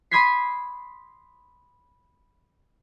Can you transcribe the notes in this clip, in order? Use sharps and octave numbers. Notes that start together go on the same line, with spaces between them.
B5 C6 D#6 G#6 B6 C7